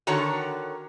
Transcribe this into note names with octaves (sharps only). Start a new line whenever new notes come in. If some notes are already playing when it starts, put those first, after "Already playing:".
D3 D#3 F#4 C#5 A5 A#5